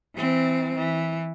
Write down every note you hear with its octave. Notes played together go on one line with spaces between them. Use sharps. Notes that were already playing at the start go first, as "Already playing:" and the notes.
E3 C4
E3